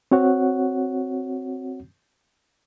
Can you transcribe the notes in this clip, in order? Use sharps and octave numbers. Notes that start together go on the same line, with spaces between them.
C4 F#4 C#5 F#5